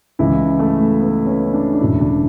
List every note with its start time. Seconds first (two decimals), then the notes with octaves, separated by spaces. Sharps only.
0.19 C#2 C#3 E3 E4
0.59 A3
1.00 B3
1.26 C#4
1.54 D4
1.73 D4
1.80 E1 D2 C#3 E3 E4
2.01 D4